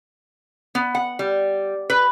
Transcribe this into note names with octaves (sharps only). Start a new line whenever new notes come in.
B3
F#5
G3
B4